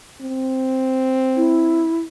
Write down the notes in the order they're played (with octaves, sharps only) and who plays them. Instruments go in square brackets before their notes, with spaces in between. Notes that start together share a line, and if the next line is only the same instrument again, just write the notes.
[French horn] C4
[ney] E4